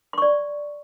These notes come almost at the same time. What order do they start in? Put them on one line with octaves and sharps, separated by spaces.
C6 C#6 D5